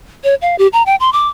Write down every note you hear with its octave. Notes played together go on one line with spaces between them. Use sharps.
C#5
F5
G4
A#5
G5
C6
D6